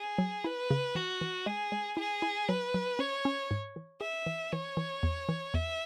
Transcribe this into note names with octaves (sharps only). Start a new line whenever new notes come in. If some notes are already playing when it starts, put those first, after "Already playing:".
Already playing: G#4
F#3
E4 B4
C#3
E3 F#4
E3
G#3 G#4
G#3
E4 G#4
E4
F#3 B4
F#3
C#4 C#5
C#4
G#2
E3
G#4 E5
E3
E3 C#5
E3
E2
E3
E2 E5